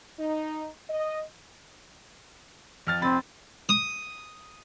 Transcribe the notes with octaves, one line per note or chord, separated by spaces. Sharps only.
D#4
D#5
F2 F6 A6
F1 C4 B5 A6
D#6